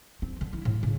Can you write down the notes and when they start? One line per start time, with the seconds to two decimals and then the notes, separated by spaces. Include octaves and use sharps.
0.22 C4
0.41 D3
0.53 E4
0.65 A2
0.83 C#3